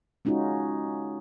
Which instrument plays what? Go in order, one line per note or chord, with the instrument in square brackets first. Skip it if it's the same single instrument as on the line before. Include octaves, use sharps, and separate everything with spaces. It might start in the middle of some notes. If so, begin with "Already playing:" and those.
[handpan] G#3 C#4 D#4 F4 F#4